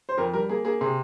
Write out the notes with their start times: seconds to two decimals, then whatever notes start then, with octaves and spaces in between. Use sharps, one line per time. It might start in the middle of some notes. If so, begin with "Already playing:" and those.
0.09 C5
0.18 F2 A#4
0.33 G3 A#4
0.49 A#3 G#4
0.65 A#3 G#4
0.81 C3 G#4